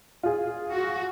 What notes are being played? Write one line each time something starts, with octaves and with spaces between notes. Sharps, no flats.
F4 G#4
F#4